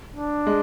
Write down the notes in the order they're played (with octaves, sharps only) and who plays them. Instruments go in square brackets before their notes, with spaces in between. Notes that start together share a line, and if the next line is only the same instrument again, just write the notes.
[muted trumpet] D4
[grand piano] G#3